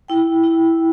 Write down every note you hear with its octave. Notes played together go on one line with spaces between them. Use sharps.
E4 G5
E4